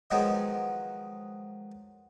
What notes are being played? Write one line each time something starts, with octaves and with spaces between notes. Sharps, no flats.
D#3 F3 F#3 G#3 B3 D#4